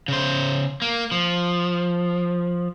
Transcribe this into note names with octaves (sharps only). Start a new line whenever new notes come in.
C#3 C5
A#3
F3